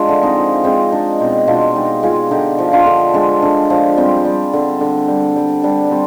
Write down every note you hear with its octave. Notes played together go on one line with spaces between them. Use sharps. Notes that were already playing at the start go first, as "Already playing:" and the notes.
Already playing: F3 G#3 D4 F4
D3
C4 D#4
F3
G#3 C4 D#4
G#3 D4
B2 C4 D#4
B2 D4 F4
G#3 D#4 G4
G#3 F4 G#4
D3 D#4 G4
F3
D4 F4
D3
G#3 D4
D3
F3
G3 C4
G3
D3
D3
G3
G3
G3 D4
G3 C4